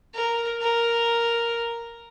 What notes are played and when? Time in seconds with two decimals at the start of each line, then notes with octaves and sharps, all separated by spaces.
0.15 A#4
0.62 A#4